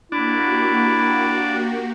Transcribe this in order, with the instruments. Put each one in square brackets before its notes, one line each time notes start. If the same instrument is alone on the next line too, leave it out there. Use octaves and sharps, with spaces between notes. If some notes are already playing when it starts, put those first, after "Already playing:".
[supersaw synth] A#3 F#4 G4 [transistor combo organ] D4 [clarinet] E4